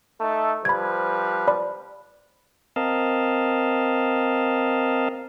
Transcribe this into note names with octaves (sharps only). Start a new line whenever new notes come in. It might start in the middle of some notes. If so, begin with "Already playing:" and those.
A3 D#4 A4
F3 G3 B4 B5 G#6
D5 B5
C4 A#4 D#5 F5 A5